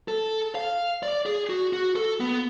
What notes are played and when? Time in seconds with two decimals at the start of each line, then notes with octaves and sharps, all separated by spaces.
0.08 A4
0.55 F5
1.03 D5
1.26 G#4
1.50 F#4
1.73 F#4
1.96 A4
2.20 B3